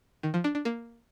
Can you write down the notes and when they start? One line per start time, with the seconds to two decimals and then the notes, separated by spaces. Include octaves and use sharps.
0.23 D#3
0.34 F3
0.44 D4
0.55 D4
0.65 A#3